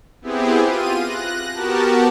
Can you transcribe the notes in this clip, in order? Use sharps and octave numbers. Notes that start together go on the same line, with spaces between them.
B3 C4 E4 G4 G#4
F4 D#7
F#6 A#6
B3 F#4 G4 A#4 A5